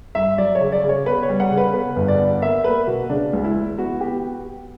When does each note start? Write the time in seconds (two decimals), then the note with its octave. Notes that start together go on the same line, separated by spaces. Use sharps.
0.15 G2 E5
0.38 F#3 D5
0.55 C#5
0.60 C#3
0.72 D5
0.83 C#3
0.89 C#5
1.06 B3 B4
1.23 C#5
1.29 G3
1.40 F#5
1.51 C#3
1.58 B4
1.74 B3 B4
1.96 G1
2.08 D5
2.19 B3
2.42 A#3 E5
2.64 A#3 B4
2.87 B2 F#4
3.09 C#3 D4
3.33 C#2
3.44 E4
3.56 E3
3.78 B3 F#4
4.01 B3 G4